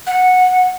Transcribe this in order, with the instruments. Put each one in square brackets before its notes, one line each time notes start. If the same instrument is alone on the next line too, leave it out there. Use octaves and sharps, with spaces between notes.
[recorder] F#5